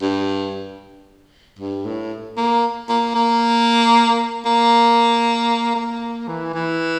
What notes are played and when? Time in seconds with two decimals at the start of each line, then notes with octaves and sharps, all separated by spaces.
0.02 G2
1.59 G2
1.85 A2
2.37 A#3
2.89 A#3
3.15 A#3
4.46 A#3
5.76 A#3
6.28 E3
6.54 E3